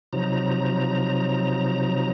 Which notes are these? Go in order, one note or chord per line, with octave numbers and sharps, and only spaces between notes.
C3 F3 F#3 D#4 A#5